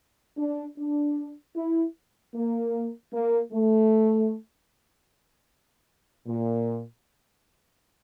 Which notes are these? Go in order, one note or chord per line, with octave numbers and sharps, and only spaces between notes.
D4
D4
E4
A#3
A#3
A3
A#2